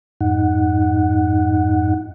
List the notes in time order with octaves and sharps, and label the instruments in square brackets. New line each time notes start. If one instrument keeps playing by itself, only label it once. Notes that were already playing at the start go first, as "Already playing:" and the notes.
[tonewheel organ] F2 G#2 D#4 F#5